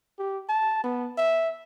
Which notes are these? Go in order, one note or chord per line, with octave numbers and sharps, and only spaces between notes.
G4
A5
B3
E5